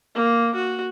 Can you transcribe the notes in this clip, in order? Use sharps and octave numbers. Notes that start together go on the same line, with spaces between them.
A#3
F#4